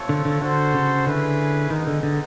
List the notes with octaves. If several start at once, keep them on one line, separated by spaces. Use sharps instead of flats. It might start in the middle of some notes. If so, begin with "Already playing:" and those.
Already playing: A3 C4 F4 A4 C#5
D3
D3
D3 F#4 A4 C5
C#3
D3 C#4 E4 G#4 B4
D#3 G#3 B3 D#4
D3
D3